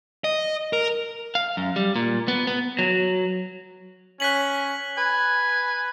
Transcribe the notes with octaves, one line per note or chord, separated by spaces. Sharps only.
D#5
A#4
F5
F#2
G3
A#2
B3
B3
F#3
C#4 F#6 B6 F#7
B4 G#5